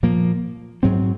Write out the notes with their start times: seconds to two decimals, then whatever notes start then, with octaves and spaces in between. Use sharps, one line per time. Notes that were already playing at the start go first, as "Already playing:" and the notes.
0.03 A#2 F3 A#3
0.83 G#2 F#3 C4